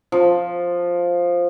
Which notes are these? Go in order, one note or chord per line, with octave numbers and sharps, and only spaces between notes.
F3